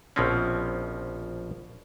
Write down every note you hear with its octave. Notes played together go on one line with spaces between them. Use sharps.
A#1 B2 F3 C4 C#4